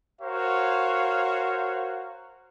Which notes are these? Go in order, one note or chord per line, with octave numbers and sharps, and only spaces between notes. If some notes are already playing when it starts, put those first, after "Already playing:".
F#4 A#4 C5 C#5 F5